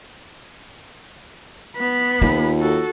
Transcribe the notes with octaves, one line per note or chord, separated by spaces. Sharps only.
B3 B5
D#2 F4
F#4 A4